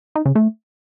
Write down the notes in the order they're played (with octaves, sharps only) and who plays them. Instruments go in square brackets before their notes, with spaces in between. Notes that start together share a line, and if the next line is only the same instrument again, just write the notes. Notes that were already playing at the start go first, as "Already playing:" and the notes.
[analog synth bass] D#4
C#3
A3